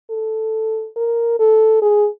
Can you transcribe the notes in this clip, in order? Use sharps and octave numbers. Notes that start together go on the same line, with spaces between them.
A4
A#4
A4
G#4